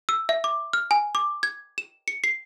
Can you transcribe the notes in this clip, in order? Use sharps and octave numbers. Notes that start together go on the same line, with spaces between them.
E6
E5
D6
F6
G#5
D6
G#6
E7
C#7
C7